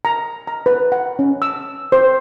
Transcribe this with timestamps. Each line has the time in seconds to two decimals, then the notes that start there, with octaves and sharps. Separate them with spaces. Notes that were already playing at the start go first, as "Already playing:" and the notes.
0.05 A#5
0.47 A#5
0.66 B4
0.92 F#5
1.19 C#4
1.42 E6
1.92 C5